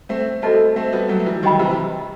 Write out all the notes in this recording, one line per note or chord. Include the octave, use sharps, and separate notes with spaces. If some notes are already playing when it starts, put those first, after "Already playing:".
A3 C4
A3 C4 F#4 A4 D#5 A5
A3 C4
G3 B3
F#3 A3
E3 G3
D#3 F#3 G4 D#5 G5 B5
C3 E3